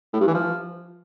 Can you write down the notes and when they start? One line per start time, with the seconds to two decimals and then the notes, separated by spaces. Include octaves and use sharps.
0.13 A2
0.20 G2
0.27 E3
0.34 F3